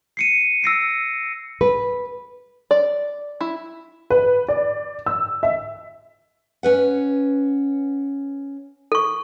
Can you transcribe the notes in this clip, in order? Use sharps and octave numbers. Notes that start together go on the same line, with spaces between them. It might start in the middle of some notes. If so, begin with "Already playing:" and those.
C7 C#7 D#7
E6 A#6 C7 D7
B4
D5
E4
B4
D5
E6
E5
C#4 B4 F#5
A4 C#6